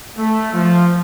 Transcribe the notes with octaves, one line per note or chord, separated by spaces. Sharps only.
A3
F3